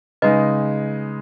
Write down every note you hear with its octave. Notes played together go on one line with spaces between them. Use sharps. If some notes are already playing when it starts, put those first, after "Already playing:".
C#3 G#3 D#4 B4 D#5